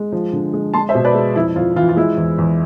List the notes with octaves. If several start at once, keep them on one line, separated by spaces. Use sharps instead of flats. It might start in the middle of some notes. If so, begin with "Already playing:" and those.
Already playing: G#3
F3
D3
G#3
G#3 A5 C6
C5 E5
B2
B4 D5
G#3
F2 E4
F2 F4
E3 F4
F4
G#3 E4
E2
E2